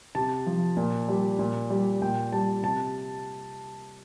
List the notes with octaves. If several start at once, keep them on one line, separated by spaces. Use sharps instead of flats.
C3 A5
F3
A#2
G3
A#2
G3
A#2 G5
G3 A5
C3 A5